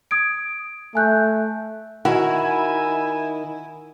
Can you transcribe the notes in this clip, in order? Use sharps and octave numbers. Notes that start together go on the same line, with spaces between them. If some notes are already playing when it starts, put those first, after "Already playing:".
D#6 G#6 D7
A3 G#5 F#6 G6
D#3 E4 F#4 E5 G#5